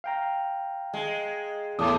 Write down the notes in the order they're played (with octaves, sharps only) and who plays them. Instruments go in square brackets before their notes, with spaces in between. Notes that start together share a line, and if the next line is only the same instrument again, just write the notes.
[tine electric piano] F5 G5 A#5
[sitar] G#3
[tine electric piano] E2 [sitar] A2 [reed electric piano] A5 D6 D#6